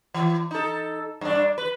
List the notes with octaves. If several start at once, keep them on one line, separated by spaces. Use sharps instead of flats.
E3
D#4 A4
G2 D4
B4